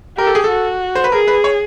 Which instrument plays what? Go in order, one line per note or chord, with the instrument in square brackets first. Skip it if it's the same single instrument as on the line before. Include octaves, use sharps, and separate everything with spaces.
[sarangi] G4 [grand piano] A#4
[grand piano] A4
G#4
A4
[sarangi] F#4
[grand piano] C5
B4
[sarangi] G#4 [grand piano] A#4
[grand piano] B4
C#5